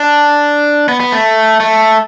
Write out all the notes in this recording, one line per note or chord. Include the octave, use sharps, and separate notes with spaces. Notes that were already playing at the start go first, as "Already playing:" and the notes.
Already playing: D4
B3
B3
A3
A3